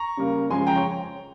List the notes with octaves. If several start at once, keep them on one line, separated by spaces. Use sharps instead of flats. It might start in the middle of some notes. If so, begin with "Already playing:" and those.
Already playing: A#5 C#6
C#3 G3 A#3
C#3 F3 G#3 G#5 C6
G5 A#5
C#5